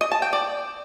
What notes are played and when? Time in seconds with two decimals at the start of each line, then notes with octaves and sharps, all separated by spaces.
0.01 D#5
0.12 A5
0.22 G5
0.33 D5